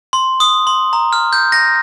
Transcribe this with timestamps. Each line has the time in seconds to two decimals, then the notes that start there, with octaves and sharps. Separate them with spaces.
0.13 C6
0.40 D#6
0.67 C6
0.93 A#5
1.13 F6
1.33 G6
1.52 G6 A#6